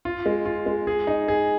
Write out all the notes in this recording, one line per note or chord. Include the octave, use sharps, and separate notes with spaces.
F4
G#3
F4
G#3
G#4
D#4
G#4